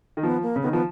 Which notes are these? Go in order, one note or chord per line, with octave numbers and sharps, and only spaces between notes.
D#3
F3 B3
A#3
C#3
D#3 B3
F3 B3